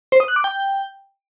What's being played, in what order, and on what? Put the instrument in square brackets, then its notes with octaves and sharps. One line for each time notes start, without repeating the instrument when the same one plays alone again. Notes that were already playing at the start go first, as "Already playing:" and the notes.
[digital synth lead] C5
D#6
F#6
D6
G5